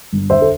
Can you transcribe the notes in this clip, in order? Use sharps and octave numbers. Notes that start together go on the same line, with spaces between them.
G1
D3 C5 E5
A4